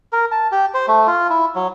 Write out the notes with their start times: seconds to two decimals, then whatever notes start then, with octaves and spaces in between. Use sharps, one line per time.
0.13 A#4
0.31 A5
0.52 G4
0.74 C5
0.88 A3
1.07 F4
1.30 E4
1.55 F#3